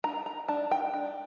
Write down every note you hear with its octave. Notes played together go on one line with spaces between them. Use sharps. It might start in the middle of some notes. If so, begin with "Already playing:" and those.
D4 A#5
A#5
D4 A5
G5
D4